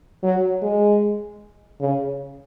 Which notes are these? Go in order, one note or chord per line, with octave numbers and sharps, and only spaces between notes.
F#3
G#3
C#3